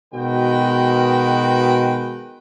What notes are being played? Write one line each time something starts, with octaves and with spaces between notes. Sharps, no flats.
B2 D#3 G#3 F#4 B4 G5